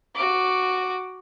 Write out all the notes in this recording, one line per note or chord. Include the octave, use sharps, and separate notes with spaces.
F#4 D6